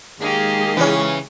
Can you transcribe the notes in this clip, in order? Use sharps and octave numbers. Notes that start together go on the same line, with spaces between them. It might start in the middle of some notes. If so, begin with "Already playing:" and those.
D#3 G#3 A#3 D#4 G4 G#4
C#3 E3 C#4